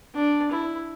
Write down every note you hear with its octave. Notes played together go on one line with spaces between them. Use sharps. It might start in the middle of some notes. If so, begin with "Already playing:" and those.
D4
E4